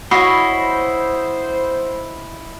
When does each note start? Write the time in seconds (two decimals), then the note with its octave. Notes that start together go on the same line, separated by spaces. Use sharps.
0.11 E4 F#4 C#5 D#5 B5 C7
0.52 C5